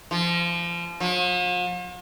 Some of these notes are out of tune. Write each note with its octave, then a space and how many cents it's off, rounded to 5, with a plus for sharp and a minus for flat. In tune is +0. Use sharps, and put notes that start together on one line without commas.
F3 -30
F3 +45